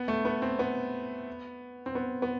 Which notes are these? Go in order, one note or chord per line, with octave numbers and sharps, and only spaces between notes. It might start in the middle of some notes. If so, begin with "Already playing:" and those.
Already playing: B3
A3
B3
C4
B3
C4
B3
B3